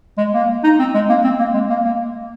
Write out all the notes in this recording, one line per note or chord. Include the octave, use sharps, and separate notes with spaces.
G#3
A#3
D#4
C4
G#3
A#3
C4
A#3
G#3
A#3
A#3